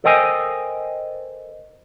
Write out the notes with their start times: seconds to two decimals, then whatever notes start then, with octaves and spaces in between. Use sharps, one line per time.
0.04 A4 A#4 C5 D#5 G5 G#5